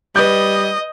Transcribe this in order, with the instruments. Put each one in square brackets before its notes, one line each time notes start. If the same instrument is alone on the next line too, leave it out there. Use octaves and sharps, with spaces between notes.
[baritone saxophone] G3 [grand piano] B4 G6 [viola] D#5